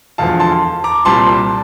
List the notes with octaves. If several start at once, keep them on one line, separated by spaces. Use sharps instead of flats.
E1 E2 D3 F3 F5 A5
A5 C6
A#5 D6
C2 A#2 G3 C4 A5 C6